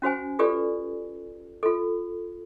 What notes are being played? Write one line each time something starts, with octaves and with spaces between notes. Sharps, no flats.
C#4 F#4 C5 G#5
F4 G4 A4 B4 D5
F4 A4